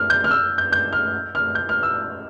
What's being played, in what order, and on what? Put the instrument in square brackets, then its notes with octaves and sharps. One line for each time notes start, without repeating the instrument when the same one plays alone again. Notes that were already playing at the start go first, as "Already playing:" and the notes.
Already playing: [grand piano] F6
G6
F6
E6
G6
G6
F6
F6
G6
F6
E6